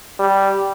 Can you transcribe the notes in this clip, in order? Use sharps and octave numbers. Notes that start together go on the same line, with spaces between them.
G3